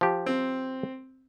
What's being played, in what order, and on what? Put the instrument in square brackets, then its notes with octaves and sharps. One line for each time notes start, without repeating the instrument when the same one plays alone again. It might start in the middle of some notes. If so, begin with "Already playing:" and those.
[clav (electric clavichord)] F3 G4
[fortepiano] C4